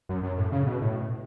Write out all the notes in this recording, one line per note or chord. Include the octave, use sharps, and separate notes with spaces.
F#2
F#2
A2
C#3
B2
A2